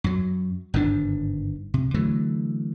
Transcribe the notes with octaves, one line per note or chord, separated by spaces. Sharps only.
F#2 F#3
G1 G#2 D#3 D4
C3
D3 E3 F#3 A3